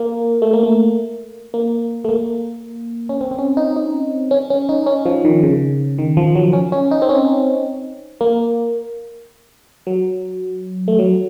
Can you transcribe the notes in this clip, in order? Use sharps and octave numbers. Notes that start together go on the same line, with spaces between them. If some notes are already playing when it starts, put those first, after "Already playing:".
Already playing: A#3
A3
A#3
A3
A#3
A3
A#3
C#4
C4
C4
C#4
D#4
D#4
C#4
C#4
D#4
C#4
F3
D#3
C#3
D#3
F3
F#3
C#4
C#4
D#4
C4
C#4
A#3
F#3
A3
F#3